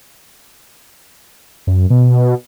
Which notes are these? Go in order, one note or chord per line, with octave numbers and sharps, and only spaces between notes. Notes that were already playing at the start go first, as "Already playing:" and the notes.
F#2
B2